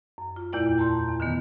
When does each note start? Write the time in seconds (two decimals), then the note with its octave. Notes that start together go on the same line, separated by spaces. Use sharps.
0.18 F#2
0.36 F4
0.53 E2 A#2 A3 E4 D5 G5
0.78 A5 A#5 C6 G6
1.08 E2
1.20 D3 D#3 B3